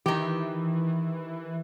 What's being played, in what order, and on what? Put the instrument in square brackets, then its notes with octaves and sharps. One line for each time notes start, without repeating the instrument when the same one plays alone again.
[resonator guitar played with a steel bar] D#3 G4 [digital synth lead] E3